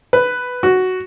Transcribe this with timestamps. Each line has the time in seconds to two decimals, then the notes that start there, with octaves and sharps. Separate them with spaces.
0.13 B4
0.63 F#4